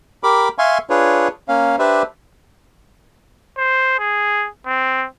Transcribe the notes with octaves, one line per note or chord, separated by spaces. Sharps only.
G4 A#4 B5 D6
E5 F5 G#5 C6 C#6
D4 F4 G#4 B4 C#5
A#3 C#4 F5
D4 G4 B4 C5 D5 E5
C5
G#4
C4